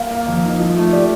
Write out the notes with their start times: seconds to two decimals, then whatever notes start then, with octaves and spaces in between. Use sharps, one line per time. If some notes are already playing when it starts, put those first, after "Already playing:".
Already playing: A#3 F5
0.10 A#3
0.27 F2
0.44 D#4
0.60 F3
0.76 A3
0.93 G4 D5